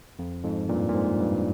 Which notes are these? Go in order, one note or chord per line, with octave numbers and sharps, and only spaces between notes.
F2
F2 G#2
G2 A#2
A#2
F2 G#2
G2